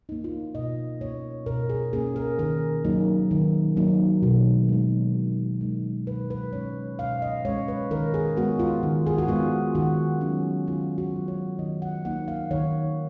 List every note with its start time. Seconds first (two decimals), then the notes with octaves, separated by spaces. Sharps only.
0.09 A#3 D#4
0.24 F4
0.55 B2 D#5
1.01 A#3 C#4 C#5
1.46 B2 A#4
1.69 G#4
1.93 A#3 C#4 G#4
2.16 A#4
2.39 D#3 A#4
2.85 F#3 A#3 D#4
3.31 D#3
3.77 F#3 A#3 D#4
4.23 B2
4.69 G#3 D#4
5.15 B2
5.61 G#3 D#4
6.07 B2 B4
6.30 B4
6.53 G#3 C#4 C#5
6.99 B2 F5
7.22 D#5
7.45 G#3 C#5
7.49 C#4
7.68 B4
7.91 D#3 A#4
8.14 G#4
8.36 G#3 B3 F#4
8.59 F4
8.83 D#3
9.07 G#4
9.18 F#4
9.28 G#3 B3 F4
9.75 D#3 F#4
10.21 F#3 C#4
10.67 D#3 F4
10.98 F#4
11.13 F#3 C#4
11.28 C#5
11.59 D#3 D#5
11.82 F#5
12.05 A#3 D#4 F#5
12.28 F5
12.51 D#3 C#5